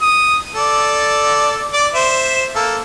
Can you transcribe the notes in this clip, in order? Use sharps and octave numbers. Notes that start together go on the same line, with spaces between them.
D#6
A4 D5
D5 D6
C5 E5
A#3 A4